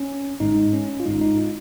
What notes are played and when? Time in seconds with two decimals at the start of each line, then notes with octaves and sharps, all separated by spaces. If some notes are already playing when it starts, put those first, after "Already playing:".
Already playing: C#4
0.40 G#1 G#2 G#3 D#4
0.73 C#4
1.00 F4
1.05 G#1 G#2 G#3 D#4
1.21 D#4
1.38 F4